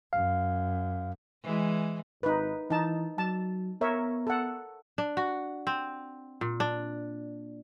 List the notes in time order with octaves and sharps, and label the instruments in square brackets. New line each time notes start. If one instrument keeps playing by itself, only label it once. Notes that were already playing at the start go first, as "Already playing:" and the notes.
[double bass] F#2 [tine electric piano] F5
[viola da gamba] E3 G#3
[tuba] G#1 [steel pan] D#4 B4
[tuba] E3 [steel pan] D#4 A5
[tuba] F#3 [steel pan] A5
[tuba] B3 [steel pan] A#4 C#5 E5
[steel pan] A4 F#5
[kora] D4
F#4
C4
A#2
D4